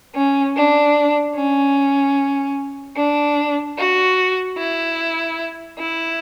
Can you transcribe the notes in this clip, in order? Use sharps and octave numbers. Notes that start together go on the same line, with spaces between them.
C#4
D4
C#4
D4
F#4
E4
E4